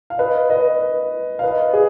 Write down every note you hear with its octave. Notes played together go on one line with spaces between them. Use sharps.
F5
B4 D#5
B4 D#5
F5
B4 D#5
G#4